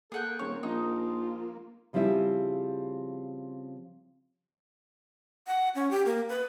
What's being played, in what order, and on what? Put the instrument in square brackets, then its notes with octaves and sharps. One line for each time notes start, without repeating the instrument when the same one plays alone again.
[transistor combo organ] A#3 [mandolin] G#4 F#5 G5 [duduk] A4
[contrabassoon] D#1 [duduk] C4 [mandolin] C#5
[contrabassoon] A#1 [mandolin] D#4 [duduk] F4
[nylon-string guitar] C#3 F3 G3 C4 E4 G#4
[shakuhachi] F#5
C#4
G4
A#3
B4